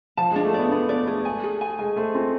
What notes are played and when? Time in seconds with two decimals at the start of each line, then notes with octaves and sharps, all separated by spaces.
0.17 F3 A5
0.31 G#3 D4
0.45 A3
0.54 B3 D5
0.71 B3 D4
0.89 B3 D5
1.07 A3 G#4
1.25 G#5
1.44 G#4
1.61 G#5
1.79 G#3 G#5
1.96 A3 C5
2.14 C4 F4